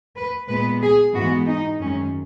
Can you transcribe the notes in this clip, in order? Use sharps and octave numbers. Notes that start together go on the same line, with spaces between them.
B4
A#2 G#3 B3 B4
G#4
G#2 E3 G#3 B3 F#4
D#4
F#2 D#3 G#3 C#4